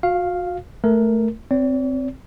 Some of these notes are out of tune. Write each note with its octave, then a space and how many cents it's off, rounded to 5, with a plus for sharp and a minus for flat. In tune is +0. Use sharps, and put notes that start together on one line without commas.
F#4 -35 F5 +0
A3 +0 A#4 +0
C4 -5 D5 -45